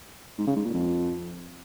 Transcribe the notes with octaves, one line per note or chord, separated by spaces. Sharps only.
G#2
C#3
G#2
A#2
F2